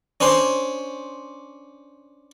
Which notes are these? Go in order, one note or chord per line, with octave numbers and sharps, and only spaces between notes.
C#4 D4 C5 C6